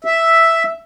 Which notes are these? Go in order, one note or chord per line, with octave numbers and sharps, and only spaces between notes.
E5